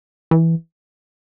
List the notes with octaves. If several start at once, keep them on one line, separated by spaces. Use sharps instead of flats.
E3